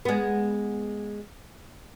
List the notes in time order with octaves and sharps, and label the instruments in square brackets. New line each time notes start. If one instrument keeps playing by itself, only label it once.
[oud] G#3 B3